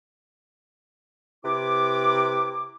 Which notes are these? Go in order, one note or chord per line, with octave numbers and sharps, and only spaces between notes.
C3 E4 B4 D6